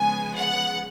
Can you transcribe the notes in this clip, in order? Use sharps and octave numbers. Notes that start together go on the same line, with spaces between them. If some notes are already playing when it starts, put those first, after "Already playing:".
Already playing: C#3 F3 G#3 B3 G#5
F#5